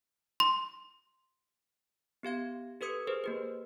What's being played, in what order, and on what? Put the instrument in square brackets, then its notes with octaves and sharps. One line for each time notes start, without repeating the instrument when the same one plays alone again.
[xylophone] C6
[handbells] B3 G4 F5 G#6
G4 A4 B4 D#6 G#6 C#7
G#4 A#4 C5
A#3 G4 B4